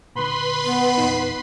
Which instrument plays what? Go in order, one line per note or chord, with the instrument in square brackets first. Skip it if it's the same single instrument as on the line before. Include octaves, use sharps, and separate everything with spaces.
[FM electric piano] A#2 D3 [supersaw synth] B4 B5 C6
[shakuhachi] B3
[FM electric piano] E2 A#2 D#4